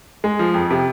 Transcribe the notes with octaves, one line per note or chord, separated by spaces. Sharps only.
G#3
F3
F2
C3